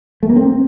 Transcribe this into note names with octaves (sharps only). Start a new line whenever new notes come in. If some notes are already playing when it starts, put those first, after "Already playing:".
A3
A#3
C4